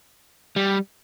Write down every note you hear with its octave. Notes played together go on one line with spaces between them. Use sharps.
G3